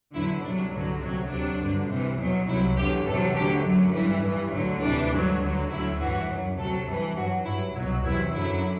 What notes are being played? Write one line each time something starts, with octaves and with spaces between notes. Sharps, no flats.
E2 D3 F#3 E4
C2 C3 F#3 D4
G2 D3 F#3
D2 C3 F#3 D4
D2 C3 F#3 D4
G2 D3 F#3
C2 C3 E3
E2 B2 F#3
C2 C3 F#3 E4
E2 D3 F#3 G4
E2 C3 F#3 A4
D2 D3 F#3 G4
F#2 F#3
E3
G2
G2 E3
D2 D3 F#3
D2 C3 E3 D4
G2 D3 F#3
D2 D3 F#3
D2 D3 F#3 E4
G2 E3 F#4
F#2 F#3
D2 C3 F#3 A4
G2 E3
G2 F#3 F#4
G2 F#3 E4
C2 B2 F#3 E4
E2 C3 F#3 E4
F#2 D3 F#3 E4